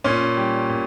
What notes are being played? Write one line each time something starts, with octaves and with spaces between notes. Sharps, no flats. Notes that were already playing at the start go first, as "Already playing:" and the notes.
A#2 C#4
G3
A#2